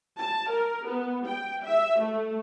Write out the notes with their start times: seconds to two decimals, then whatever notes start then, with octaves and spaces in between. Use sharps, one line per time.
0.17 A5
0.50 A#4
0.86 B3
1.25 G5
1.64 E5
2.00 A3